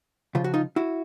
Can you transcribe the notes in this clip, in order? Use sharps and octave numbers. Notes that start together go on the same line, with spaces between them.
C#3 F3 F4
F#4
D#4 F4
E4 F#4